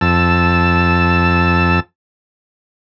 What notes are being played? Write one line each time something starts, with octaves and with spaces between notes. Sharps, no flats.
F2 A5 E6